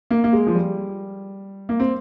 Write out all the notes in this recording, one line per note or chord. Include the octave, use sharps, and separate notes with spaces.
A#3
A#3
G#3
F3
G3
A#3
C4